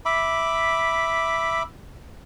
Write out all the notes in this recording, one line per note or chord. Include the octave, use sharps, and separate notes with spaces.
E5 B5 D6